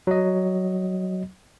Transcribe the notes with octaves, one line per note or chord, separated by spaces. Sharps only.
F#3 D#5